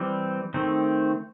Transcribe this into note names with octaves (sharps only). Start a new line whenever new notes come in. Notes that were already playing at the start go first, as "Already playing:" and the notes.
Already playing: E3 G3 C4
D#3 A3 C4